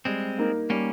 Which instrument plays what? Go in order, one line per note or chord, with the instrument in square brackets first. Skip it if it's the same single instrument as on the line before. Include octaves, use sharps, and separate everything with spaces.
[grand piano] G3 [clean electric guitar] G#3 C4
[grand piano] A#3 D#4 A#4
[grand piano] G3 [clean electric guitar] A#3 C#4